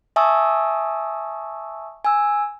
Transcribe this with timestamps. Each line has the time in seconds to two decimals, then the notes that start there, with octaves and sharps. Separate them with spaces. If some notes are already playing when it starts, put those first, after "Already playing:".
0.16 E5 G#5 A5 C#6 D#6 E6
2.05 G#5 E6